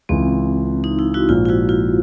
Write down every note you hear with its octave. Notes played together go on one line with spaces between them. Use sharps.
C#2 C#3 E3 C4
D#4
E4
E4 F#4
A#1 G#2 F3 F4
F4
E4 F#4
F4